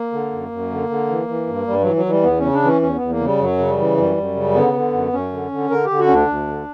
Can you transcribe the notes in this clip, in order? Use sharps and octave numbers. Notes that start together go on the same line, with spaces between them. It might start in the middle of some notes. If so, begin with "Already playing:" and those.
Already playing: A#3
D3
F#2
F#2
D3
D3
E3
E3
G2
G2 G3
E3 F#3
F#3
E3 G3
E2 B3
C#3 C#4
D4
E3 C#4
E2 C#4
B3
E2
A#3
C#3 G3
F#2 F#3
C#3
G3
E3
F#2 G3
F#2
C#3
D3 B3
D3
F#2
F#2 C#4
D3
D3
D3 A#4
G4
D3
F#4
C#4
D2 D4
D2
D3